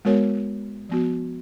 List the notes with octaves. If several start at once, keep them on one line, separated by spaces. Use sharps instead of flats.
G#3 B3 F#4 A#4 C#5
F3 B3 F#4